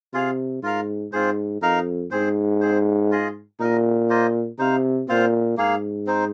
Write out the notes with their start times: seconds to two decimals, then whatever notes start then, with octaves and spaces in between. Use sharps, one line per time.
0.14 C3 F4 G#4 F5
0.62 G#2 F4 A#4 F5
1.12 G#2 C4 F4 G#4 C5
1.61 F2 D#4 A#4 F5
2.11 G#2 C4 G#4 C5
2.61 C4 G#4 C5
3.11 F4 G#4 D#5
3.60 A#2 D#4 A#4 D#5
4.10 A#3 F4 C5 D#5
4.58 C3 D#4 C5 F5
5.08 A#2 C4 F4 C5 F5
5.57 G#2 A#3 G#4 F5
6.07 C4 D#4 C5